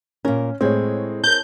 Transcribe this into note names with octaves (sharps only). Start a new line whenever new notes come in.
A#2 C#4 A#4
A2 G#3 C4 G#4 C#5
A#4 A5 G6